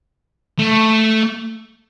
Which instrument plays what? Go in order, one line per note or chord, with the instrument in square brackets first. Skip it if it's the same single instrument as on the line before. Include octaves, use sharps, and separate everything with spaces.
[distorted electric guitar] A3